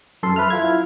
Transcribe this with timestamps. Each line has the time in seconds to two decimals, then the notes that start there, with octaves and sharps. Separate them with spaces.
0.23 F#2 A4 C6
0.36 B4 E5 F6
0.50 E4 F4 G#6